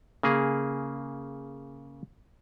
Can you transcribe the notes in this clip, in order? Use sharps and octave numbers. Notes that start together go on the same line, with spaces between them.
C#3 A#3 G#4